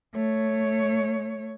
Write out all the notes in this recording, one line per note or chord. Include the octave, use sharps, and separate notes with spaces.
A3 C#5